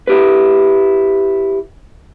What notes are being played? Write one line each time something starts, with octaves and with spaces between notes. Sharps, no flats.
E4 G4 B4